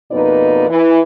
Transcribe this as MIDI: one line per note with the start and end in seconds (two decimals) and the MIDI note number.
0.12 0.66 41
0.12 0.66 47
0.12 0.66 58
0.12 0.66 63
0.12 0.66 71
0.12 0.66 74
0.69 0.99 52